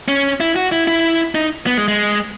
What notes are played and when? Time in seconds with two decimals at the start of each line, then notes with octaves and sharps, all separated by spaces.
0.08 C#4
0.40 E4
0.56 F#4
0.72 E4
0.87 E4
1.35 D#4
1.67 B3
1.77 G#3
1.88 G#3